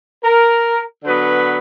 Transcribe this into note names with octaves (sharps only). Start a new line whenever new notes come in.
A#4
D3 F#3 B3 B4